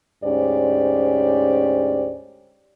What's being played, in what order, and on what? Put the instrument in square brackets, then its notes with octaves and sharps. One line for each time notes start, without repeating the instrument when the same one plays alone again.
[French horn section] D2 G#2 C#4 G4 C5 D5